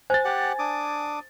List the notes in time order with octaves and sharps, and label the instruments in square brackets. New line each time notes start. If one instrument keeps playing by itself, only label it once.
[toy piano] C5 [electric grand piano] G#5 A6
[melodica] G4 F#5
D4 D6 D#6